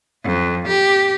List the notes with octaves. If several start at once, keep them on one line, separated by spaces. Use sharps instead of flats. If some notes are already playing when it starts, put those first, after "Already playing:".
F2
G4